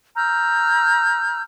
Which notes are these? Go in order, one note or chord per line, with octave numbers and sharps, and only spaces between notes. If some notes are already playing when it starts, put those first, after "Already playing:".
A#5 E6 F6 G6